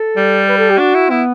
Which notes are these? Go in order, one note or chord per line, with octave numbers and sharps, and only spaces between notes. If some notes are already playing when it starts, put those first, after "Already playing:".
Already playing: A4
G3
B4
A4
G4
D4 F#4
E4
B3 E4